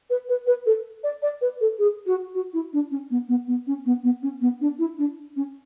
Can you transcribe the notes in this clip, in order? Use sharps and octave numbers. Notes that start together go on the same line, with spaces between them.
B4
B4
B4
A4
D5
D5
B4
A4
G#4
F#4
F#4
E4
D4
C#4
B3
B3
B3
C#4
B3
B3
C#4
B3
D4
E4
D4
C#4